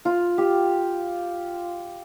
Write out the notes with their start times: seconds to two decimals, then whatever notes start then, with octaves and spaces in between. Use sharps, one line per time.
0.05 F4
0.38 G4